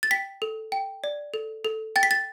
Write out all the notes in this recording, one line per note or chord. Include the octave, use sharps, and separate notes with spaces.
A6
G5 B6
A4
G5
D5
A4
A4
G5 A6
B6
A6